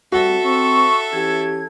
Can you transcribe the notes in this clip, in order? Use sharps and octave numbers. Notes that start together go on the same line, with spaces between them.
G3 A3 C4 F#4 A4 E5
C4 C#6
E3 C#4 G4 G#6